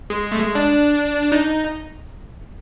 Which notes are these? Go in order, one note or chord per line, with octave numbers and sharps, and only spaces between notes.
G#3
A3
G#3
D4
D#4